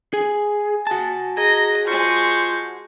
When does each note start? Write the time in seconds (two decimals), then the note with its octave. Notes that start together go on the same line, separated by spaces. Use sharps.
0.13 G#4 G#5
0.87 F#4 A5
1.37 G#4 D#5 A#5
1.87 G#3 F4 C5 C#6